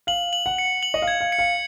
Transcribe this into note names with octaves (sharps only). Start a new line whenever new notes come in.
F5 F#7
F#7
F#5
C#7
F#7
D#5
F5
G#6
F5
C#7
F5